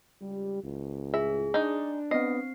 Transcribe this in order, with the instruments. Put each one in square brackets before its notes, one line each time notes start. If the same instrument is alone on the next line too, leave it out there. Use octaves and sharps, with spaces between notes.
[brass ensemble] C#2 G4 [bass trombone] G3
[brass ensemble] F#1 [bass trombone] C#2
[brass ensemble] A2 F4 [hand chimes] G#4 [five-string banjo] E5
[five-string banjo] G#3 D#4 [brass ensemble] D4
[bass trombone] B3 [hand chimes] C4 C7 [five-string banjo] D#5